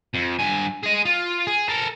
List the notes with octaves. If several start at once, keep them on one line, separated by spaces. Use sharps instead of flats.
F2
G2 G#5
G#4 D#5
F4
G#4
A4 A#4